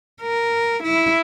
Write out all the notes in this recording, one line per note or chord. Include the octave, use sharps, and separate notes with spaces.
A#4
E4